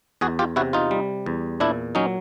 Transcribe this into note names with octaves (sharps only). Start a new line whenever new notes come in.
E2 F#4 G#4
F4 G4
C3 E4 F#4
D#4 F4
G3
E2
A#2 D4 E4
F#3 C#4 D#4